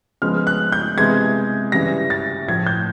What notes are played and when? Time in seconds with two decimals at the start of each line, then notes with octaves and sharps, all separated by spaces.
0.22 C#3 F3 G#3 B3 F6
0.47 F#6
0.72 G6
0.97 C3 E3 G#3 B3 G#6
1.72 C#3 E3 G3 A#6
2.10 A6
2.48 A2 F3 A3 G#6
2.66 G6